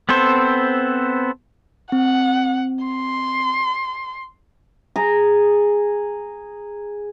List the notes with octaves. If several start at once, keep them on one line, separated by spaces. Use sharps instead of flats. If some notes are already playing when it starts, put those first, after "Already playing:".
B3 C4 A4 C5
C4 F#5
C6
G#4 A#5